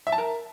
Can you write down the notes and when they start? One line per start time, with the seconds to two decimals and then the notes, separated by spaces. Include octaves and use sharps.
0.07 E5
0.12 A5
0.18 A#4